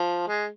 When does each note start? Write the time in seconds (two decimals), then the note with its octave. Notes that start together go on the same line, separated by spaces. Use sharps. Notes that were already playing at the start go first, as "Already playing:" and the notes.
Already playing: F3
0.27 G#3